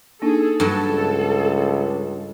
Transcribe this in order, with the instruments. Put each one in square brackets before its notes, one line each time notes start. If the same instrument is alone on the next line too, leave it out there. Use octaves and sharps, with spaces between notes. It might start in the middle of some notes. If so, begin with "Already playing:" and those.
[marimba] A#3 D4 D#4 [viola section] G#4 A4
[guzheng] G2 F#3 [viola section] A4
[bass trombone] C#2